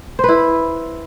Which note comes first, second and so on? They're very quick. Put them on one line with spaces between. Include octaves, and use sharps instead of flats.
C5 B4 E4